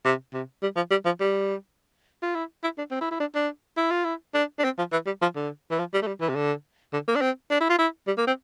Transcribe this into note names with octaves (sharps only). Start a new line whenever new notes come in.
C3
C3
G3
F3
G3
F3
G3
F4
E4
E4
D4
C4
E4
E4
D4
D4
E4
F4
E4
D4
D4
C4
F3
E3
G3
F3
D3
E3
F3
G3
A3
G3
E3
C3
D3
D3
A#3
D4
C4
D4
E4
F4
E4
G3
A#3
C4